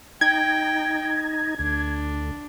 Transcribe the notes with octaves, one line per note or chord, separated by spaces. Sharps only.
D#4 G5 G#6
D2 D4